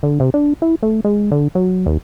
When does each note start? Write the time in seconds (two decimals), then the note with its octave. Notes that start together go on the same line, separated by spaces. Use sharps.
0.03 D3
0.20 C3
0.34 D4
0.62 E4
0.83 A3
1.05 G#3
1.32 D3
1.55 F#3
1.86 D#2